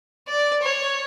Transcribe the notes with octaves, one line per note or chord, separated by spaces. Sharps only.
D5
C#5